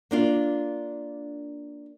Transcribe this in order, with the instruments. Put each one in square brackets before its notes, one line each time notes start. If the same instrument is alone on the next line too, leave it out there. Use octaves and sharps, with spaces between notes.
[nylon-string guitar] A#3 D4 F4